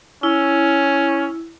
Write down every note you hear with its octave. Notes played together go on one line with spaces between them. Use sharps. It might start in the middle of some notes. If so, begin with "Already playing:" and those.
C#4 E4